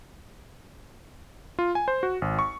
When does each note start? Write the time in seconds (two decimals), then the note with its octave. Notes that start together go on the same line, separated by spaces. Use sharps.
1.59 F4
1.75 G#5
1.88 C5
2.03 F#4
2.22 G#1
2.39 C#6